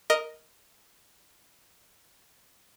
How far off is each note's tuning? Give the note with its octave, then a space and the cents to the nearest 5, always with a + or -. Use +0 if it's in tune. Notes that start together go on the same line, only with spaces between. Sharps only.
A#4 +0 D#5 +0